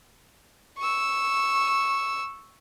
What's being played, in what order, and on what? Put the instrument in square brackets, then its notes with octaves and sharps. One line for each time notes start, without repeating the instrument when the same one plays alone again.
[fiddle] C#6 E6